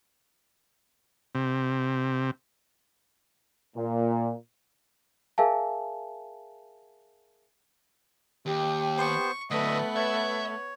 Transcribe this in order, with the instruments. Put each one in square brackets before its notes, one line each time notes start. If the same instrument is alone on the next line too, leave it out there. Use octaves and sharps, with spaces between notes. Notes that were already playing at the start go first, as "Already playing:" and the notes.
[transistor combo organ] C3
[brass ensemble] A#2
[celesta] G#4 A#4 E5 F5 G#5 A5
[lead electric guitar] D#2 [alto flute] G4
[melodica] B3 C5 [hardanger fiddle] C#6
[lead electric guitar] D3 F#3 [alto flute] A3 [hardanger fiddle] B3 B4 [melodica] D#5 E5
[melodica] C#5 [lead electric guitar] E5